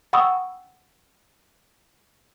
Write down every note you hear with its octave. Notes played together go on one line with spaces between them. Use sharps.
F#5 G5 B5 C#6 D#6 E6